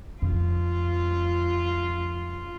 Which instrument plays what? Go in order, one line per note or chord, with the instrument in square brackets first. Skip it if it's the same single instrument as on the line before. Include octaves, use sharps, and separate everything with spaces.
[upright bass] F2 [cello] F4